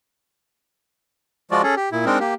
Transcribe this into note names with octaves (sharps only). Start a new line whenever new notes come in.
F3 G#3 F4 F#4 D5
C#4 G#4 A4
G4
A#2 E4
G#3 C4 D4 D#4 A#4
A#3 G4